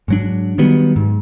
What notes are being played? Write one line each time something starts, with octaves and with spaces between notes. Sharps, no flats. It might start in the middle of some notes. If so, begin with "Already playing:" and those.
G#2 F#3 D4
D#3 F#3 G3 B3
G#2